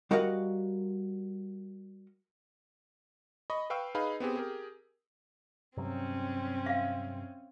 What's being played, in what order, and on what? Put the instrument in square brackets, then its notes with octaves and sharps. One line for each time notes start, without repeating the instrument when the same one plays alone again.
[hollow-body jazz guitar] G3 F#4 A#4 D#5 F5 F#5
[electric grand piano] D#5 B5 C#6
B4 F5 G5 C#6 E6
D#4 G#4 B4 F5 B5
B3 C4 G4 G#4
G4 G#4 A#4
[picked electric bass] G2 C3 F#3 [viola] C4 C#4
[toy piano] E5 F5